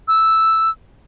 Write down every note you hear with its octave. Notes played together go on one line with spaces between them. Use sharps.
E6